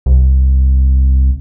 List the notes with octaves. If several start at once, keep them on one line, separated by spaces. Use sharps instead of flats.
C2